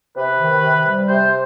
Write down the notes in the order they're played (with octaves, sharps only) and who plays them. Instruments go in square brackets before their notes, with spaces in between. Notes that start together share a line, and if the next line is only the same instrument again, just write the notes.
[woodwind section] C3 B4
D#3
C3
G3
C3 C5